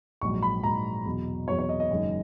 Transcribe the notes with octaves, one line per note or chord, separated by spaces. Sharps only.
A#1 G#2 F#3 C#6
B5
A#1 G#2 F#3 A#5
E2 B2 F#3
E2 B2 F#3 C#5
C#5
D#5
D#5
F#1 F#2 D#3 G#3